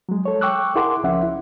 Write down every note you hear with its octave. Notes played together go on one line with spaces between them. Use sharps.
F#3 G#3
A4 C#5
G5 C#6 D6 E6 F#6
E4 G#4 A#4 F#5 C6 D6
C#2 F3 C#4 E5 F#5
E4